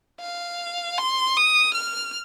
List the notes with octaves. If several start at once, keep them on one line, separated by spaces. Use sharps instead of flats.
F5
C6
D#6
F6